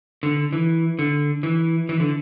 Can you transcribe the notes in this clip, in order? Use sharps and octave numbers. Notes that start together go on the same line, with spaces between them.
D3
E3
D3
E3
E3
D3